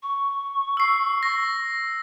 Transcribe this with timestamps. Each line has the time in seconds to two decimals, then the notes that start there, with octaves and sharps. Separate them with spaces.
0.03 C#6
0.77 E6 C7
1.23 A#6